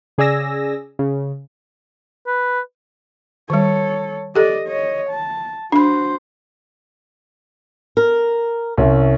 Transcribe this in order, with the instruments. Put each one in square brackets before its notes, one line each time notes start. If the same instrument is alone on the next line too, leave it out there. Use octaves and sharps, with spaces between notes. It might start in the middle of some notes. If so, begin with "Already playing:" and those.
[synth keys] C#3 G#4 D5 G#5 E6 A#6
C#3
[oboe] B4
[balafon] D#3 G3 [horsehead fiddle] A4 C#5
[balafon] G4 A4 [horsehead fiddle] D5 D#5
[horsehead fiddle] C#5 D#5
A5
[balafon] D4 B5 [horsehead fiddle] F#4 C5
[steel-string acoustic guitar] A#4
[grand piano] C2 C#4 E5